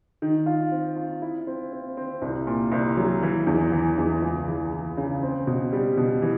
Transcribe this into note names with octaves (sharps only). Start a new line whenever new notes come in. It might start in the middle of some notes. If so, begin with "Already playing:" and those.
D#3
F4
C4
F4
E4
C4
C4
C4
C2
A#2
C2
F#3
E3
E2
E3
E2
C#2
E3
E3
C#3
C4
B2
G3
B2
E3